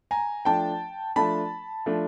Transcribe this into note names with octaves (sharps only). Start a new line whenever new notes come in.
G#5 A#5
F3 A3 D4 G5 A5
F3 A3 D4 A5 B5
F3 A3 D4